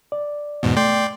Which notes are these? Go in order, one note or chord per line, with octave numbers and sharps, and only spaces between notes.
D5
E2 G#2 B2
A3 D5 G5 C6